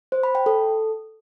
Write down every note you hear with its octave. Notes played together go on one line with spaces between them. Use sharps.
C5
B5
G5
A4